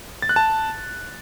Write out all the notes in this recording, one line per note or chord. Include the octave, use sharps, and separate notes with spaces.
A6
F#6
A5